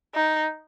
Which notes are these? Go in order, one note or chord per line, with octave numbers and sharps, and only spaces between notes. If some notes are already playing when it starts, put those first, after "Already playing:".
D#4